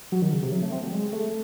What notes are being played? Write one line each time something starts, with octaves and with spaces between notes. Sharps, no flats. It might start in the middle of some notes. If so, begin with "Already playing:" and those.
F#3
D#3
C#3
C3
F#3
A3
C4
F#3
G#3
A3